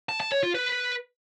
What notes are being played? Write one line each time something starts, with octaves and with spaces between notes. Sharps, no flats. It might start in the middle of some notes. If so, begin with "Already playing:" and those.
A5
A5
C#5
F4
B4